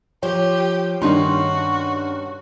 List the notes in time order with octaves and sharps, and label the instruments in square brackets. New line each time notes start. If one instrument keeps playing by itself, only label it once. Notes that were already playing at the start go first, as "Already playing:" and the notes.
[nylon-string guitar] F3 [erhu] G4 [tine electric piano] C#5
[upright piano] G2 D#3 C6 [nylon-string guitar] C#4 D#4 [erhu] F#4